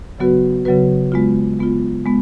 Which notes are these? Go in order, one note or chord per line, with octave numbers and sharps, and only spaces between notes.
C#3 F#3 B3 F#4 B4
C#3 F#3 B3 F#4 B4
G#3 B3 F4
G#3 B3 F4
G#3 B3